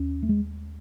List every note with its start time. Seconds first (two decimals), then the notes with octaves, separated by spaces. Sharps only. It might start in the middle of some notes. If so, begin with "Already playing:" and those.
Already playing: D#2 C#4
0.23 A3
0.29 G#3